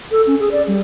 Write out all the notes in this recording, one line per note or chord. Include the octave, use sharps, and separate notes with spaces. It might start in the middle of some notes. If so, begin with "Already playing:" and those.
A4
C#4
G#4
D5
G3